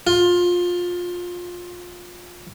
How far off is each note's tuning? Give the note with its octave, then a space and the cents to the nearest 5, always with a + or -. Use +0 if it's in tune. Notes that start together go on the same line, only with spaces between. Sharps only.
F4 +20